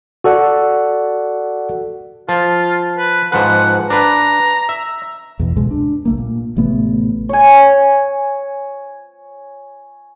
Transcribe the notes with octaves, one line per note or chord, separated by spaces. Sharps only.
F#4 A4 D5 F#5
F3 F4
B4
G#2 F3 B4 F#5
D4 B4 A#5
E5
E2 B2
C#2 B2 G#3
D4
C2 A3 A#3
A#2
A1 C3 A3 B3
C#5 G#5